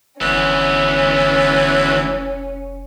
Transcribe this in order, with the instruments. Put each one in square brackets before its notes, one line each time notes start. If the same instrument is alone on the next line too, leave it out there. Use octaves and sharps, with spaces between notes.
[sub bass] F1 [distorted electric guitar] D2 B3 [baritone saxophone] E3 [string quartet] C#4